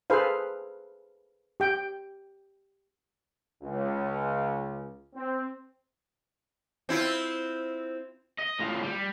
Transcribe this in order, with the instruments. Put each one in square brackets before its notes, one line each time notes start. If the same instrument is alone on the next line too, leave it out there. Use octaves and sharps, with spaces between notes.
[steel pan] G#4 A4 B4 C5 F5
G4 G5
[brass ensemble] C#2
C4
[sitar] C4 E4 F4
[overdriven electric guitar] D#5
A2 F4
G3